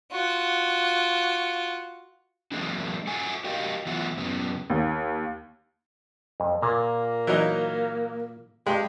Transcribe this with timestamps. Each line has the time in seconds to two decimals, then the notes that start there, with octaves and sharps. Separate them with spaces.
0.11 F4 F#4
2.52 E3 F#3 G#3 A#3 C4 D4
3.07 F#4 A4 F#5 G#5
3.44 F#4 G4 A#4 D#5 F5 G5
3.86 E3 F#3 A3 B3 F4 F#5
4.17 F#2 C#3 B3
4.70 D#2
6.40 F2
6.62 A#2 A#3
7.27 E3 F#3 D#4
8.66 G2 G#3 G4